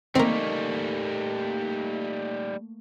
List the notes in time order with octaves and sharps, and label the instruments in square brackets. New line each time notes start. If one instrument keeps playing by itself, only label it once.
[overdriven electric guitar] G3 D#4 [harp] A3 A#3 [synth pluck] C4 A#4